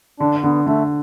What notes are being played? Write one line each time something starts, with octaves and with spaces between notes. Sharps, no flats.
D3 D4
D3 B3
D3 A3